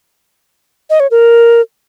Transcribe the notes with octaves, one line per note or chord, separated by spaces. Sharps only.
D#5
C#5
A#4